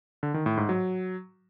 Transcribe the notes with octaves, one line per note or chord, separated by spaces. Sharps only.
D3
D#3
A2
G#2
F#3